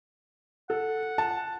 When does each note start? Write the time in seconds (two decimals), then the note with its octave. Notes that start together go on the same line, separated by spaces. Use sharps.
0.70 A4 F#5
1.18 A5